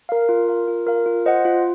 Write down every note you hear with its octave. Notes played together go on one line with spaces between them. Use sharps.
A#4 F5
F4
A#4 F5
F4
A#4 F5
F4
C5 D#5 F#5
F4